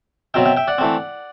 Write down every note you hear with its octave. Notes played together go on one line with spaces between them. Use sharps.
B2 F#3 C4 E5 G5
E5 G5
E5 G5
D5 F#5
E3 A3 C4